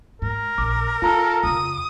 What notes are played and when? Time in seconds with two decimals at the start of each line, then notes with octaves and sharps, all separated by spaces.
0.22 G#2 A#4
0.58 A#1 D6
1.02 D#4 F4 A4 A#5 E6
1.43 F2 C#3 D#6